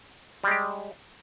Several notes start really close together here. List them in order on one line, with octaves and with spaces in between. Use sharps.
G3 G#3 G4